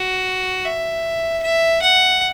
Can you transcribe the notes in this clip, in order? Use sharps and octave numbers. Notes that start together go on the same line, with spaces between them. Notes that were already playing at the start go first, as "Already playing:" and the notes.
Already playing: F#4
E5
E5
F#5